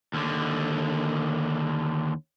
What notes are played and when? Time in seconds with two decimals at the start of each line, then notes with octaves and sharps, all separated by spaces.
0.14 D#2 D3